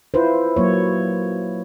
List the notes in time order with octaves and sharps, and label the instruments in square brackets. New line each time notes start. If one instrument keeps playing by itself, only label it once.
[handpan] E4 F4 B4 C5
F#3 A#3 C#5